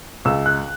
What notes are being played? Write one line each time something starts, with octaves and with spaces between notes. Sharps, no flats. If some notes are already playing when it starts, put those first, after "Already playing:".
C#2 E6
F#6